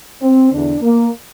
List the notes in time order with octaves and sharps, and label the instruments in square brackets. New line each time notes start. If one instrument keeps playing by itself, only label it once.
[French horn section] C4
E2 D3 D4
A#3